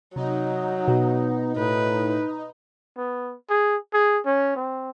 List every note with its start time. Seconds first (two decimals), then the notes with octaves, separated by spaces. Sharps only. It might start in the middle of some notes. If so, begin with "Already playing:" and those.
0.16 C3 F#3 D#4
0.88 B2 B3 F#4
1.57 A2 B4
2.97 B3
3.49 G#4
3.93 G#4
4.25 C#4
4.56 C4